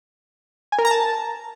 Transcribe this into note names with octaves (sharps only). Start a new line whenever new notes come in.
G#5
A#4
A#5
A5